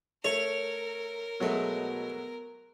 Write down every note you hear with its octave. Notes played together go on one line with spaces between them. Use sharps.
A3 A#4 C#5
B2 F#3 G#3 A3